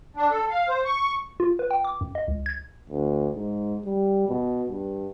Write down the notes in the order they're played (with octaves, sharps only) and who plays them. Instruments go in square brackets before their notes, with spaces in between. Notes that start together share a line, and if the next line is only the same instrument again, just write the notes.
[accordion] D4
A4
F5
C5
C#6
[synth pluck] F4
B4
G5
D6
F#2
D#5
C#2
G#6
[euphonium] D2
G#2
G3
B2
G2